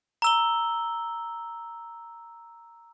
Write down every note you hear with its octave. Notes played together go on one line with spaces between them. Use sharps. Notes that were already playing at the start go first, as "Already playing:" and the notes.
A#5 E6 G7